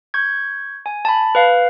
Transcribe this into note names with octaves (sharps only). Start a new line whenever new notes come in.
C#6 G6 G#6
G#5
A5 B5
B4 F5